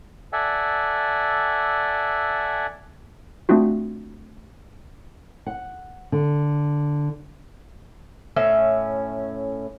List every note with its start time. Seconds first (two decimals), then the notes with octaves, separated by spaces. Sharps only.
0.33 A4 D5 E5 F#5 G#5
3.49 A3 C4 D4 F4 F#4
5.47 F#5
6.12 D3
8.36 A2 C#4 E5